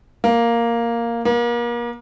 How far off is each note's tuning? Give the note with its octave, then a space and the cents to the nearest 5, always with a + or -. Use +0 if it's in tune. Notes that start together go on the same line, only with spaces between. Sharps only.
A#3 +0
A#3 +35